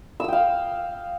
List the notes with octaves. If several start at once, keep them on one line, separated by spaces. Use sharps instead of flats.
F5 G5 D#6 E6